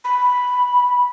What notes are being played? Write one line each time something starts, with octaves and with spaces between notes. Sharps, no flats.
B5